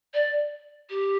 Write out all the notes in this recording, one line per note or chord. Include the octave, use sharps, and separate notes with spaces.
D5
G4